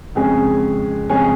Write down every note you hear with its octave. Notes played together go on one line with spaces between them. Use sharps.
F2 C#3 G#3 C#4 G#4
F2 C#3 G#3 C#4 G#4